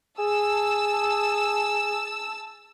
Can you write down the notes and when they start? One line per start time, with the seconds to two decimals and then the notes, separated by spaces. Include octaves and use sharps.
0.19 G#4 A5 E6